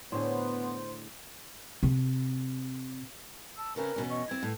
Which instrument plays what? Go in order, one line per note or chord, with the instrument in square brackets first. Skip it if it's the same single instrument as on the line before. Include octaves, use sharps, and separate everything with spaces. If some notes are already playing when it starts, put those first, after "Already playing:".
[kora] A2 D3 G#4 [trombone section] B3 [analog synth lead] C5
[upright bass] C3
[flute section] A5 E6
[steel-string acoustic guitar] C#3 C4 C#4 [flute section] A#4 B4
[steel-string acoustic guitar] E2 B2 C#4
[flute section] D#5 C#6
[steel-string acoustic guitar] C4 E4 [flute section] G#6
[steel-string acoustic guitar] A2